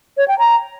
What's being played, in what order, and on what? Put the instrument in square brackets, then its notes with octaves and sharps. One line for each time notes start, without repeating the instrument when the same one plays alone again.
[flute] C#5
G5
A#5